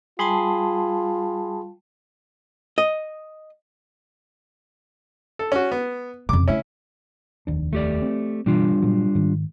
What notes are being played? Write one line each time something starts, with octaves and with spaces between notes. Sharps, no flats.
G3 F4 G#4 A5 B5 C6
D#5
A4
C#4 F#4
B3
F2 C#3 D6
C#3 A3 C#4 E4
F1 D#2 D4
A3 G4 D5
C4
B2 E3 G3 D4 F4
A#2 F#3
G#2 D#3